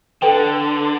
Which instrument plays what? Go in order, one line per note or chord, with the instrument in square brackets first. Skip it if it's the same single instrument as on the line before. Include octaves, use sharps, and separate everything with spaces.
[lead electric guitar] D3 [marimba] A4 B4 G5